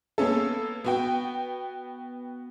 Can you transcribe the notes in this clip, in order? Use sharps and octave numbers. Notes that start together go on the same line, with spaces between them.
A#3 B3 C#4 A4
B3 F#4 G5